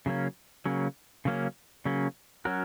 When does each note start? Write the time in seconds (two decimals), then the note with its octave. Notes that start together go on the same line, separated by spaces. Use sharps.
0.06 C#3 F#3 A#3 C#4
0.66 C#3 F#3 A#3 C#4
1.25 C#3 F#3 A#3 C#4
1.85 C#3 F#3 A#3 C#4
2.45 F#3 C#4 F#4 A#4